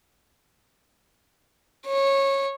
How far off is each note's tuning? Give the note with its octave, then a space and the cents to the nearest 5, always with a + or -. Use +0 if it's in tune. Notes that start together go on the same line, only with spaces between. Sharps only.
C#5 -15